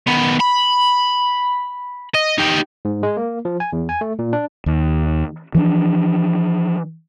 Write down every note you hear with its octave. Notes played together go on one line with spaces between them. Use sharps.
D#3 B3
B5
D#5
D#4 G4
G#2
G#3
A#3
F3
G#5
E2
G#5
A3
A#2
D4
D#2
E3 F3 C4 D4